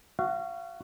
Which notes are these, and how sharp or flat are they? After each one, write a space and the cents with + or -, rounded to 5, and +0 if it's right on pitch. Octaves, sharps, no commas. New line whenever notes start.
F#4 +0 F5 -35